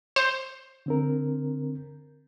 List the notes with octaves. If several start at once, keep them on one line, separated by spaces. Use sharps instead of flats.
C5
D3 C4 A#4